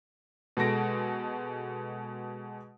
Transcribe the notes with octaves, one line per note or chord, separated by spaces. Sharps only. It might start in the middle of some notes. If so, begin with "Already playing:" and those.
B2 G#3 A4 A#6 D7